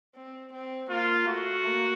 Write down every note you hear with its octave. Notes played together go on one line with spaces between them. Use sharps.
C4
C4
A#3 F4
A3 F#4
A#3